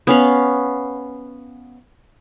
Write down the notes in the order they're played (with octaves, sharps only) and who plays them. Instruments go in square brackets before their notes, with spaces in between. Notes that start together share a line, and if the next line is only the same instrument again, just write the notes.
[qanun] B3 C#4 F5